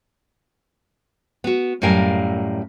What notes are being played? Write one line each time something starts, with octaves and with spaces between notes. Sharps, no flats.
B3 F#4
F#2 A2 G3 A#4 F5 G#5